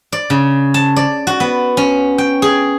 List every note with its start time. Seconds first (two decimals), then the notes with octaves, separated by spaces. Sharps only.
0.12 D5
0.30 C#3
0.74 A5
0.96 D5
1.27 F#4
1.40 B3
1.77 C#4
2.18 G5
2.42 G#4